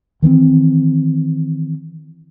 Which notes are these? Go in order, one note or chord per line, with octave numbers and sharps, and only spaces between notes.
D#3 E3 B3 C4